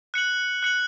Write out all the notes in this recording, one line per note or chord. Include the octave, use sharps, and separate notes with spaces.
F#6 C#7 F#7
F#6 C#7 F#7